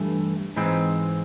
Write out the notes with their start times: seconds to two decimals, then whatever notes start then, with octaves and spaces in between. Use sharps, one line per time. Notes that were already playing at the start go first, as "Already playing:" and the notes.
Already playing: G2 E3 A3
0.56 G#2 E3 G#3 C4